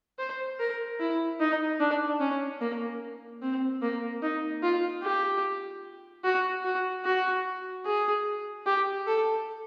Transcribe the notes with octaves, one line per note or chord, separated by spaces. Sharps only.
C5
A#4
E4
D#4
D4
C#4
A#3
C4
A#3
D#4
F4
G4
F#4
F#4
F#4
G#4
G4
A4